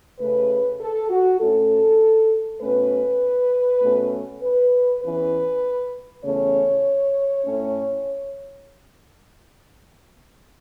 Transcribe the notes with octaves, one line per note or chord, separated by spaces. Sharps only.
C#3 A3 C#4 B4
A4
F#4
A2 A3 C#4 A4
B2 A3 C#4 B4
B2 A3 C#4
B4
E2 E3 C#4 B4
E2 C#3 A3 C#4 C#5
A2 A3 C#4